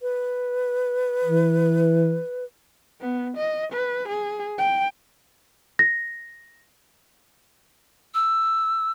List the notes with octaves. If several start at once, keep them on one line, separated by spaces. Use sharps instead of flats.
B4
E3
B3
D#5
B4
G#4
G5
A#6
E6